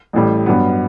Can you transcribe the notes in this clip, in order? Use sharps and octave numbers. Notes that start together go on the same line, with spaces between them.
A1 A2 G3
G2 F#3 B3